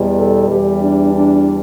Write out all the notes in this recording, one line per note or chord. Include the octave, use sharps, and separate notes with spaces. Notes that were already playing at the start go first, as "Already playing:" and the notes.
Already playing: E2 B2 G3
A4
E2 E3 G3 G4
D4
D4